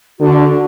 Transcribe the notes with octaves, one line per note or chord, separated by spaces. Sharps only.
D3 D4 F#4